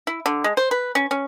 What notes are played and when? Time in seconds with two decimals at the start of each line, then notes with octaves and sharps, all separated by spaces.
0.07 E4
0.26 D3
0.44 G#3
0.57 C5
0.71 B4
0.95 C#4
1.11 C#4